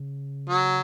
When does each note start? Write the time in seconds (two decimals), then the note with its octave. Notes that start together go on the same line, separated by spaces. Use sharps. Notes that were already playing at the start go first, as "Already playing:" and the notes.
Already playing: C#3
0.49 F#3